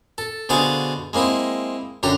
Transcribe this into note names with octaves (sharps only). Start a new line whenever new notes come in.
A4
B2 D3 F#4 G#4 C5 F5
G#3 A#3 C4 E4
F#2 D3 G4 A#5